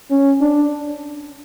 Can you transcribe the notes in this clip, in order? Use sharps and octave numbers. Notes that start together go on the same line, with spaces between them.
C#4
D4